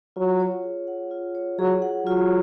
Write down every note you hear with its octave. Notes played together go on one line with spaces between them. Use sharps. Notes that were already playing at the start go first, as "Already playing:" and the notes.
F#3 F4
C#5
G#4
F#5
F4
C#5
F#3 G#4
F#5
F#3 F4